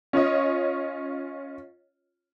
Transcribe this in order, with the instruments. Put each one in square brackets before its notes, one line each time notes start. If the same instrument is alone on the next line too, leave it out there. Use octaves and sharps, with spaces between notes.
[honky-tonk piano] C#4 F4 C#5 D#5